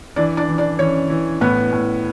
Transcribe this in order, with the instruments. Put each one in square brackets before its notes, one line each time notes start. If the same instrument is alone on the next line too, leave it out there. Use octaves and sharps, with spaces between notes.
[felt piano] E3 D4 D5
D4 D5
E3
D4 D5
E3 C#4 C#5
E3
A2 B3 B4
A2